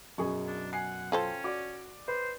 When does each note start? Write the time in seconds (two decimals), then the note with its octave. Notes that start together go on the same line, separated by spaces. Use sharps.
0.18 F#2 B2 G#4 C#6
0.47 D4
0.73 F#5 G#5 C7
1.12 C#4 F4 A4 C5 G5
1.44 F#4 D5 D6
2.08 B4 C5